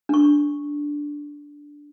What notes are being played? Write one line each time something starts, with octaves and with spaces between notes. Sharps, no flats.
D4 C#6